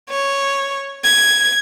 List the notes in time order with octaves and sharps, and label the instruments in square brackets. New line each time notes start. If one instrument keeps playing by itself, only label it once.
[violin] C#5
G#6